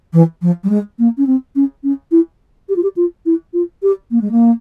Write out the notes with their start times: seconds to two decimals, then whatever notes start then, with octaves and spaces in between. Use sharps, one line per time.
0.13 E3
0.42 F3
0.64 G3
0.70 G#3
0.99 A#3
1.18 C#4
1.27 C4
1.56 C#4
1.84 C#4
2.11 E4
2.69 G4
2.76 F4
2.83 G4
2.96 F4
3.26 E4
3.53 F4
3.83 G4
4.11 A#3
4.21 G#3
4.31 A#3